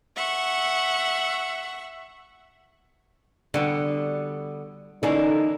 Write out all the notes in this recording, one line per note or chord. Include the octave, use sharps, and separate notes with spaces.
E5 F#5 C#6
D3 G3 B3 F#4
D3 E3 A#3 C#4 D#4 E4 A4